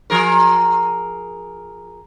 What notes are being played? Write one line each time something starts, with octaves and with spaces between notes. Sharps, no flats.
F3 G#4 A#4